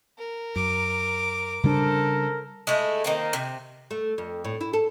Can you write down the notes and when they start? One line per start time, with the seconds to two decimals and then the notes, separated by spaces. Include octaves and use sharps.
0.18 A#4
0.56 F#2 D6
1.64 C#3 G3 D4 A4 A#4 C5
2.67 G#3 A3 E4
3.04 D#3 A#3 C4
3.33 C3
3.91 A3
4.18 F2
4.45 A2
4.61 E4
4.73 A4